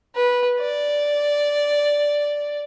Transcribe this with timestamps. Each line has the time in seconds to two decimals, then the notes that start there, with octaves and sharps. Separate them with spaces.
0.15 B4
0.60 D5